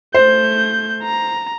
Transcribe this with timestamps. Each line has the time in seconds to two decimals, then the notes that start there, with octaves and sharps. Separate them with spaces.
0.14 A3 C5 G6
1.03 A#5